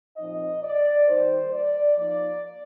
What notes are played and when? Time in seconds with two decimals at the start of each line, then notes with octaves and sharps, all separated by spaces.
0.17 A#2 F3 C4 D#4 D#5
0.63 D5
1.07 D#3 G3 A#3 D#4 C5
1.52 D5
1.97 F3 A#3 D#4 D5